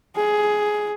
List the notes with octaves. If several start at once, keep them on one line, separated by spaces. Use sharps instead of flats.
G#4